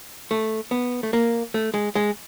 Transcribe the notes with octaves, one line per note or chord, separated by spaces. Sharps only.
A3
B3
A3
A#3
A3
G#3
G#3